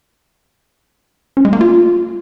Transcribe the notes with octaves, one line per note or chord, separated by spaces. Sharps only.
C#4
G#3
A#3
F4